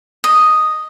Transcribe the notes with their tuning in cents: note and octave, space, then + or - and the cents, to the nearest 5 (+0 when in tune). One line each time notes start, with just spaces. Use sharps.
D#5 +0